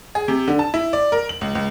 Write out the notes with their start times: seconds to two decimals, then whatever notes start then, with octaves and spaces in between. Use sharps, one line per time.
0.15 G#4
0.28 C3
0.48 D3
0.59 A5
0.74 E4
0.93 D5
1.12 A#4
1.29 F#7
1.41 C#2
1.55 C#2